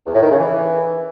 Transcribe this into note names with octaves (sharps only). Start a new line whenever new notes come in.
E2
A2
D#3
C#3
E3